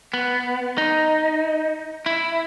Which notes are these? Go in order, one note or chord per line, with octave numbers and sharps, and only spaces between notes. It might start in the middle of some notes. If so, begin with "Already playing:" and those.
B3
D#4
E4